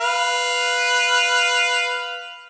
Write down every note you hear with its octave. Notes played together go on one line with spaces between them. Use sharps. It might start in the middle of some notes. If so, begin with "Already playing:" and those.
B4 F5